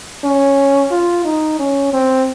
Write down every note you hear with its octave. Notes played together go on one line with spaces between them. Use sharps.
C#4
F4
D#4
C#4
C4